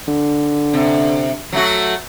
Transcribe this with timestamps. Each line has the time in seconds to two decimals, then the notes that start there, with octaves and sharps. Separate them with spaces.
0.08 D3
0.73 C3
1.52 F#3 A3 F#4